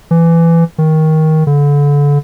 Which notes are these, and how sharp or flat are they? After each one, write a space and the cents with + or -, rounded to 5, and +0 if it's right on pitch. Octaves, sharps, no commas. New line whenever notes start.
E3 +20
D#3 +15
D3 -30